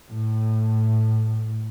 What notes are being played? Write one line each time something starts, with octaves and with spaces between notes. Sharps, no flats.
A2